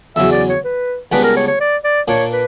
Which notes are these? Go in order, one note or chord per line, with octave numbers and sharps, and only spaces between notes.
E2 C#3 F#3 E5
D5
C#5
B4
C#2 C#3 G3 B3 D4 B4
A#4
C#5
C#5
D5
D5
A#2 A#3 D4 C#5
B4